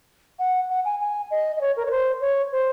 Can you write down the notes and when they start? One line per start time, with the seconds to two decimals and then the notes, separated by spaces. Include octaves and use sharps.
0.39 F#5
0.69 F#5
0.85 G#5
1.00 G#5
1.31 D#5
1.57 D#5
1.61 C#5
1.77 A#4
1.85 C#5
1.91 C5
2.21 C#5
2.52 C5